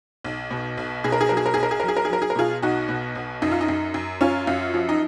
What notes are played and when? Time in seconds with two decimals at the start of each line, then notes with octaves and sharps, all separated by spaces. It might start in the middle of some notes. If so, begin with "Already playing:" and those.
0.24 B1
0.51 B2
0.77 B1
1.04 B2 G#4
1.12 A#4
1.21 G#4
1.29 F#3 A#4
1.37 G#4
1.46 A#4
1.54 B1 G#4
1.63 A#4
1.71 G#4
1.80 A#4
1.83 F#3 G#4
1.97 A#4
2.05 G#4
2.09 F#3 A#4
2.22 G#4
2.30 A#4
2.36 B2 F4 G#4
2.62 B1 D#4 F#4
2.89 B2
3.15 B1
3.42 F#2 D#4
3.51 F4
3.61 D#4
3.68 F#2
3.94 F#2
4.21 F#2 C#4 F4
4.47 F#2
4.74 F3
4.89 D#4